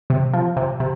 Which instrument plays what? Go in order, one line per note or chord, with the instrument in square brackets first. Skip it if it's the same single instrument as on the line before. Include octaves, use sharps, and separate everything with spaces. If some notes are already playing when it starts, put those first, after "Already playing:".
[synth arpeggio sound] C3
F3
C3
C3